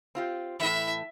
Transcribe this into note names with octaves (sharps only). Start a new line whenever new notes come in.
C4 F4 G4
A2 E3 E5